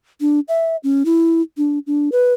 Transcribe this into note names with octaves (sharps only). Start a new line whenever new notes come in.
D4
E5
C#4
E4
D4
D4
B4